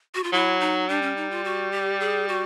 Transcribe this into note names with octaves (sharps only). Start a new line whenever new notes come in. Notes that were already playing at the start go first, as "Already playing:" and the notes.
F#4
F4
F#3 E4
D#4
G3 D4
C#4
D#4
F4
F#4
G4
G#4
F#4